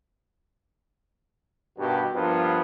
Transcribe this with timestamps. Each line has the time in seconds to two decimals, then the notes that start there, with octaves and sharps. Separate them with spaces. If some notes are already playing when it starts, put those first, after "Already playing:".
1.78 G2 B2 D#3 F#4 G4
2.14 G2 F3 A#3 B3 F4